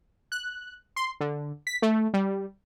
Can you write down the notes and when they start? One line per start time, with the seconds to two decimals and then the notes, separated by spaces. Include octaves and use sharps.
0.32 F#6
0.96 C6
1.20 D3
1.67 B6
1.82 A3
2.14 G3